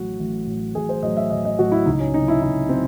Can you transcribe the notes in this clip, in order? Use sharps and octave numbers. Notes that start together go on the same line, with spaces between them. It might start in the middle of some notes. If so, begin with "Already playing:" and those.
Already playing: A1 A2 F#3 F#4
A1
A2 F#3
A1 G#4
C5
A2 F#3 D#5
E5
A1 D#5
D#5
A2 F#3 F#4
E4
C#2 D#4
C#4
C3 F#3 D#4
E4
C#2 E4
F#3 C4